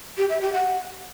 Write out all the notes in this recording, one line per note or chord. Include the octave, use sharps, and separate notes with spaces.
G4
E5
G4
F#5